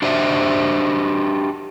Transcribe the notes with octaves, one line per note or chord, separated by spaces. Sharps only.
D4 F#4 G4 C5 D5 E5